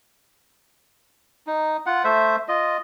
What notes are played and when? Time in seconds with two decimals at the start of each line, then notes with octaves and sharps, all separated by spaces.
1.47 D#4
1.86 F4 F#5
2.04 A3 C5 E5
2.48 F4 D#5